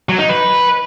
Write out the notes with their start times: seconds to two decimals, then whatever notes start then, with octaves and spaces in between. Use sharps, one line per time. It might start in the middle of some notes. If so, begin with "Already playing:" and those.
0.09 F#3
0.19 D#4
0.29 B4